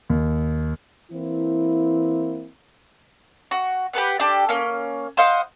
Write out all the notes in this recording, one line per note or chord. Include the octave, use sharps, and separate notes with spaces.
D#2
E3 A#3 C4 E4
F#4
G4 A4 B4 F#5
D4 G4 A4
A#3 C#4
C5 D#5 F5 F#5